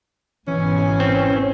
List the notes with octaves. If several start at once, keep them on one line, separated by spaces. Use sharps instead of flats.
G#1 B2 E3 C#4 G#5
C4